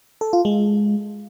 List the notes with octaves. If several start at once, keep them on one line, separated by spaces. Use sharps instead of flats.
A4
F4
G#3